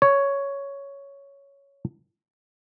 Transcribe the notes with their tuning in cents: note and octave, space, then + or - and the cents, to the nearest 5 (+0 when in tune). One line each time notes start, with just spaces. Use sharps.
C#5 +5